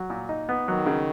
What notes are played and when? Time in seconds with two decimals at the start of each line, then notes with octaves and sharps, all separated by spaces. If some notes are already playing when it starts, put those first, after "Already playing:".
Already playing: F#3
0.10 A#2
0.29 D#4
0.49 B3
0.68 D#3 F#3
0.86 C#3